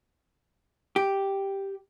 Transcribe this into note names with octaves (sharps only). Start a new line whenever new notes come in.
G4